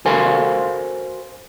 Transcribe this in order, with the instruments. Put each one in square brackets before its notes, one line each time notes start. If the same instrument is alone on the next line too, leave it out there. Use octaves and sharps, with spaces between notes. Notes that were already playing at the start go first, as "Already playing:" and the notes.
[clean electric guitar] F#4 A4 A#4 C5 F5 G#5